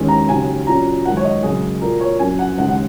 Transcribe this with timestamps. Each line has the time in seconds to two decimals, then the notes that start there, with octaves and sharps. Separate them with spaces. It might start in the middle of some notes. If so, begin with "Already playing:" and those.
Already playing: D#2 D#3 G#3 C#4
0.09 A#5
0.29 D#2 C#3 F#3 G#5
0.67 A#2 F#3 C#4 A#5
1.05 F#2 D#3 G#3 F#5
1.17 C#5
1.24 D#5
1.43 F#2 C#3 G#3 G#4
1.81 A#2 F#3 A#3 A#4
2.01 C#5
2.19 F#2 F#3 C#4 G#5
2.39 F#5
2.58 D#2 C#3 G#3 F#5
2.69 F#5